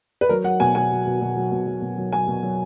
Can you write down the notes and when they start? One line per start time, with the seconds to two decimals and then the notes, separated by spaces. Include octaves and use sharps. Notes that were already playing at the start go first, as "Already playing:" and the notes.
0.21 B4
0.29 F#3 A#4
0.44 F#3 F#5
0.60 B2 G#5
0.75 B2 G#5
0.91 F#3
1.06 B2
1.21 B2
1.36 F#3
1.52 B2
1.66 F#3
1.82 B2
1.98 F#3
2.12 F#3 G#5
2.28 B2
2.43 F#3